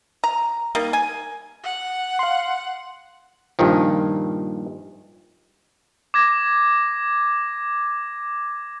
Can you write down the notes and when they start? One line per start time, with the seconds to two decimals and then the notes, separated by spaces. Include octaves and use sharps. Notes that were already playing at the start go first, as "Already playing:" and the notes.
0.24 A#5
0.75 G3 A#3 D#4
0.93 G#5
1.64 F#5
2.19 F5 C6
3.59 G2 A#2 D#3 F3
6.14 D6 G#6 A#6